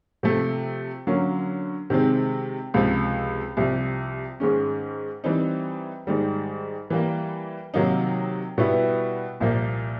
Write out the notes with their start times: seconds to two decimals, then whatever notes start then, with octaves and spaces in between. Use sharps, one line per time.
0.23 C3 F3 A3
1.07 D3 F#3 A#3 C#4
1.90 C3 D#3 G#3 C4
2.74 C#2 C3 F3
3.57 C2 C3 F3
4.40 G#2 D#3 G#3 C#4
5.24 E3 G3 C4 D#4
6.07 G#2 D#3 G3
6.90 E3 G3 A#3
7.74 C3 D#3 F#3 A#3 D#4
8.58 B2 G3 B3 E4
9.40 C2 A#2 F3 A#3